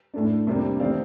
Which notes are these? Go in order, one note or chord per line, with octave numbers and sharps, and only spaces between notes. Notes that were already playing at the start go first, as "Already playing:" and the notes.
A2 A3 D4
C3 G3 A#3 D4
D#3 A3 C4 D5 F5